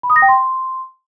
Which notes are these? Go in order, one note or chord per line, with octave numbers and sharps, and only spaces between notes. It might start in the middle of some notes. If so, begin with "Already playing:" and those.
B5
D#6
A#6
G5
C6